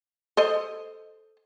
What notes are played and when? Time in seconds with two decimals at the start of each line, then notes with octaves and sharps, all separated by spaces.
0.37 A4 C5 D#5